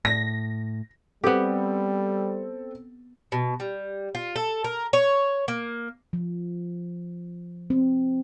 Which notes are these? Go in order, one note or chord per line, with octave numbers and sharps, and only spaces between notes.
A2 A#6
G3 B3 C4 G4 A4
B2
G3
F4
A4
A#4
C#5
A#3
F3
C4